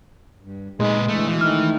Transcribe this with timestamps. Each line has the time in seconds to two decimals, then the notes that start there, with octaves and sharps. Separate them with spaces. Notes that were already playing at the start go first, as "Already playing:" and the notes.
0.42 G2
0.80 A#2 G#3 D#4 G#4 B4
1.08 D3 E3 A3
1.28 B2 E3 F5
1.41 D#3 A3 D#4 F6